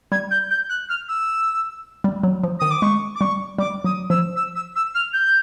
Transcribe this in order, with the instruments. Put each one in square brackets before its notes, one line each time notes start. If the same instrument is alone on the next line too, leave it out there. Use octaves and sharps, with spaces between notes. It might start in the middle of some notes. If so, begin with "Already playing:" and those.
[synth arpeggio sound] G3 [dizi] G#6
[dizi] G6
G6
F#6
F6
E6
[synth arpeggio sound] G3
F#3
F3
[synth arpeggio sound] D#3 [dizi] D#6
[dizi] D6
[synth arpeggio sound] G#3 [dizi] C#6
[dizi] D6
[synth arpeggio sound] G3 [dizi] C#6
[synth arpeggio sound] G3 [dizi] D6
[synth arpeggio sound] F#3 [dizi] D#6
[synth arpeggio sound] F3 [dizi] E6
[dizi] E6
E6
E6
F6
G6